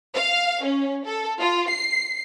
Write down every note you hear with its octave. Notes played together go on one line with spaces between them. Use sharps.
F5
C#4
A4
F4
C7